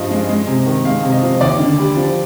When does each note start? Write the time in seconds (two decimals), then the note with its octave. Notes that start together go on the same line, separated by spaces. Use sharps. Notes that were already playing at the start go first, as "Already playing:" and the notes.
Already playing: G2 F3 D#5
0.10 G#3
0.29 G#3
0.47 C3
0.66 D#3
0.85 G#3 F5
1.03 C3
1.12 D#5
1.23 F3
1.41 D#2 D5
1.60 D3
1.78 G3
1.97 F3